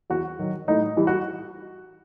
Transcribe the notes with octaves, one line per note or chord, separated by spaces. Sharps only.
E2 F#4
D#3 F#3
A2 D#4
E3 G3
F#4